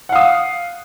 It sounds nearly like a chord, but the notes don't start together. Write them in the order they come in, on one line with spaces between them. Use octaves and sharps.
F#5 F5 D#6